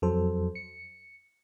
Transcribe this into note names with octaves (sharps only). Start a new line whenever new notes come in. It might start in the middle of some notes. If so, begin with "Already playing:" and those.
F2 F#3 A4 C5
C#7